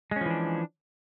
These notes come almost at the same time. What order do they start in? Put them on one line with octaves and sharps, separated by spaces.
G#3 C#4 F3 E3 D4